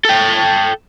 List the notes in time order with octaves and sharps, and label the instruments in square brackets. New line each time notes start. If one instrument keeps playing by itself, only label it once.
[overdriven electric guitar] A4 G5